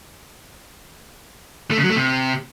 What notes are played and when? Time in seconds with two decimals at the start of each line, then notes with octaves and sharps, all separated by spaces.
1.71 A3
1.77 C#3
1.83 F#3
1.90 A3
1.96 C3